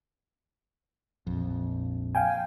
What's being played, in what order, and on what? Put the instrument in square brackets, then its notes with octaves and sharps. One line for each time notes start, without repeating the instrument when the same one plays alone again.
[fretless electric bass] A#1 F2
[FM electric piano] F5 G5 G#5